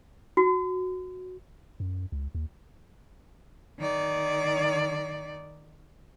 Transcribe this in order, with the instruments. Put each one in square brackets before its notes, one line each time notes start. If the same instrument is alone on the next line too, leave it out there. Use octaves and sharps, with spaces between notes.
[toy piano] F#4
[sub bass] F#2
C#2
D#2
[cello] D#3 D5